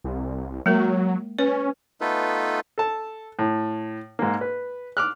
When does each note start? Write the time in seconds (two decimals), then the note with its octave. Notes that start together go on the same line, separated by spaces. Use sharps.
0.04 C2
0.66 F#3 G#3 A#3 A#4
1.39 C#4 B4
2.01 A3 B3 D#4 F4 A4 B4
2.78 A4 A5
3.39 A2
4.19 G#2 A#3
4.41 B4
4.97 D6 F6 F#6